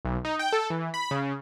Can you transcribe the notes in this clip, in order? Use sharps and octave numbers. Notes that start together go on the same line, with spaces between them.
B1
D#4
G5
A4
E3
B5
C#3